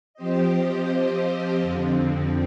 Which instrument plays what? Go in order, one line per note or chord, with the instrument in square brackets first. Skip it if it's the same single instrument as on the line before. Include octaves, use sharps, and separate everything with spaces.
[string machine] F3 C4 G4 C5 D#5
F2 D3 F3 C4